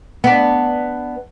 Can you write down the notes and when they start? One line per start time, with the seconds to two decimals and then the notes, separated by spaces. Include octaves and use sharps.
0.24 B3 D4